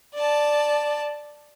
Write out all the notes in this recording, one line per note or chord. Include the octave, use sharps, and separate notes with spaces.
D5 A5